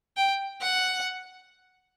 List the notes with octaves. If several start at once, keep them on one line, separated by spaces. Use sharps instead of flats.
G5
F#5